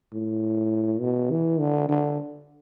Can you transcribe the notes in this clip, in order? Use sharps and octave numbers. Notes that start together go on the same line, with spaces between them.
A2
B2
E3
D3
D3